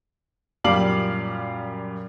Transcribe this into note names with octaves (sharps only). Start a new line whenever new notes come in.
F#2 A#2 G3 F5 D6 F#7